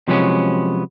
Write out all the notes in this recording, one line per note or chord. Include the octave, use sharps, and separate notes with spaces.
C3 F3 F#3 G#3 B3 C#4